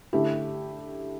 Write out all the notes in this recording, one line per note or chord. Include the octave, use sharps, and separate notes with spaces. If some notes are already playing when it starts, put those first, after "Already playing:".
D3 A3 E4 G4